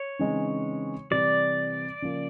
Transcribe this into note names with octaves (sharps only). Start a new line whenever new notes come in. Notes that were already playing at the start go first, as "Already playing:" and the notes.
Already playing: C#5
C#3 E3 G#3 C4 D#4
C3 E3 G3 D5
C#3 F3 A#3